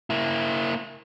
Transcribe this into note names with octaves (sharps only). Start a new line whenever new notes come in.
A#3 E4